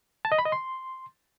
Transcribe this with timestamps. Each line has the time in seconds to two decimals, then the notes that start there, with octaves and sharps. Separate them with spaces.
0.25 A5
0.32 D#5
0.39 B5
0.45 D#5
0.52 C6